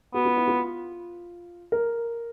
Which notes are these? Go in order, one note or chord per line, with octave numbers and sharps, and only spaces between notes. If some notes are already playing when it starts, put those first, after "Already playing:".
B3 F#4
F4
E4
F4
A#4